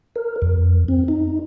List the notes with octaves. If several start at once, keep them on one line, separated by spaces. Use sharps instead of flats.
A#4
F2
C4
D#4